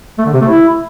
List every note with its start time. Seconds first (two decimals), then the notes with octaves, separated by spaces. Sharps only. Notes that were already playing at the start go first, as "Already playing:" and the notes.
0.19 A3
0.26 D3
0.34 C3
0.41 A3
0.48 E4